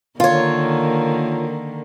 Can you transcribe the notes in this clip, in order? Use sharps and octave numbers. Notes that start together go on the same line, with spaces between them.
D3 D#3 A#3 F4 C#5